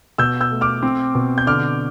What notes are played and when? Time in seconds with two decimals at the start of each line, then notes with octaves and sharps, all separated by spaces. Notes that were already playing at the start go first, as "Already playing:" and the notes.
0.18 B2 E6 G6
0.41 E6 G6
0.51 A3
0.61 D6 F6
0.83 C4
1.15 B2
1.38 G6
1.47 D3 D6 F6